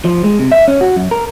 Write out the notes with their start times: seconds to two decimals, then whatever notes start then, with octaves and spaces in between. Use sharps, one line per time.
0.05 F3
0.24 G#3
0.39 C3
0.52 E5
0.68 C#4
0.81 F#4
0.96 F#2
1.11 A#4